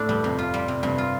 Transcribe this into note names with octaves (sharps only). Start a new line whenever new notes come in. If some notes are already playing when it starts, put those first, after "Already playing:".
Already playing: A2 D4 A4 C5
G2 G3
F2 C3
F4
G3
C3
G2 C3
F4